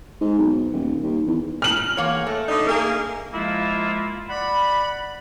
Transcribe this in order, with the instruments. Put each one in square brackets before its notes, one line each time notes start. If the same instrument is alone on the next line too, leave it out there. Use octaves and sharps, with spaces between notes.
[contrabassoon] G#2
B1
D#1
D#2
E2
[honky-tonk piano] F6 F#7
[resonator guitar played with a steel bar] E2 A#3 C#5
A3
[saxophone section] D3 D#4
A#3 G#4 A#4
[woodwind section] F3 G#3 A#3 E4 F4
D5 F#5 B5